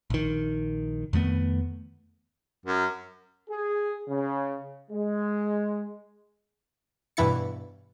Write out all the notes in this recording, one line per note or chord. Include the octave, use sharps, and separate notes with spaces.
A#1 D#3
F2 D#3 A3 B3
F#2
G#4
C#3
G#3
G2 B2 E3 E4 A6 C#7